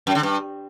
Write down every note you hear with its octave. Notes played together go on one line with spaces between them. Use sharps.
F#2
D3
G2